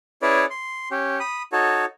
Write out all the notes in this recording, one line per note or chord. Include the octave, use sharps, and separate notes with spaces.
C#4 E4 G#4 B4 C#5 D5
C6
C#4 G4
B5 D#6
D#4 F#4 A4 C#5